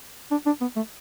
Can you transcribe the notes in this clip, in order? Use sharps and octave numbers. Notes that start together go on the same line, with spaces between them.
D4
D4
B3
A3